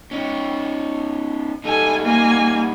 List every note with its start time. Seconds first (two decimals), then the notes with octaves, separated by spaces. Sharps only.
0.11 C#4 D#4
1.64 G3 D#4 A4 G#5
2.02 A#3 G#5